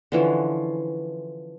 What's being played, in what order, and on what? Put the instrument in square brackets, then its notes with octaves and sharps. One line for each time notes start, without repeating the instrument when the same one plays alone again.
[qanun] D3 E3 F3 C#4